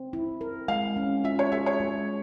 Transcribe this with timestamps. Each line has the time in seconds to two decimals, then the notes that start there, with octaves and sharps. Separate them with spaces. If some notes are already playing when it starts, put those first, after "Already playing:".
Already playing: C4
0.13 E4
0.41 A#4
0.68 G#3 F5
0.96 C#4
1.24 F4 E5
1.39 C#5
1.52 G#4 E5
1.66 C#5
1.80 G#3